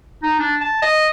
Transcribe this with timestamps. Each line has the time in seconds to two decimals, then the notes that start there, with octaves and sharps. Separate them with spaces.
0.23 D#4
0.39 D4
0.61 A5
0.82 D#5